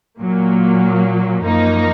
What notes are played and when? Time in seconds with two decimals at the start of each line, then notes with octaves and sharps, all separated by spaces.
0.18 A#2 F#3 A#3
1.43 F#2 F3 A#3 D#4 A#4